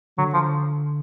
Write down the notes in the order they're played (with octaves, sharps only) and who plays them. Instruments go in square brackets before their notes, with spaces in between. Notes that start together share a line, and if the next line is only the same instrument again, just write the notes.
[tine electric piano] D3 [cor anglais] F#3
[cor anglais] F3